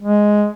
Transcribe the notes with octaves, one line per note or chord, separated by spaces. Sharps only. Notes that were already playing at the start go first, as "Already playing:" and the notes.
G#3